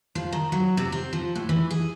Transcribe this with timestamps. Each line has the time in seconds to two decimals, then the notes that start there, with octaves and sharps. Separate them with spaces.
0.15 F3
0.32 D#3
0.52 F#3
0.77 C3
0.92 C4
1.13 F3
1.35 A2
1.49 E3
1.71 G#4